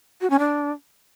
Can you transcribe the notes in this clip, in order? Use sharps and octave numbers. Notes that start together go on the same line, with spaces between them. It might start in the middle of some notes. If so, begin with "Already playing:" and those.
F#4
C#4
D4